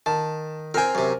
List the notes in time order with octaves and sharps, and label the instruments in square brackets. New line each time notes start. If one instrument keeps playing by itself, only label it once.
[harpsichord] D#3 [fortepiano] A5
[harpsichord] C4 G5 [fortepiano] A#4 C5 G#5
[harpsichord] F#2 C3